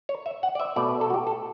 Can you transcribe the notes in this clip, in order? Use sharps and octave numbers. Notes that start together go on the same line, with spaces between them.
C#5
E5
F#5
D5
E5
B2 A3 D5
B4
A4
F#4
G4
A4